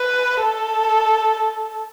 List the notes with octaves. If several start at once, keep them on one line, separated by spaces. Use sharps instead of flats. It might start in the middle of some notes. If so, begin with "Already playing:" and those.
Already playing: B4
A4